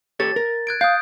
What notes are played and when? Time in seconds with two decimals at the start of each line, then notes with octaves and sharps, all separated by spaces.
0.20 G4 A4 C#5 A6
0.36 A#4
0.67 F#6 G#6 D7
0.81 F5 D#6 F#6 G6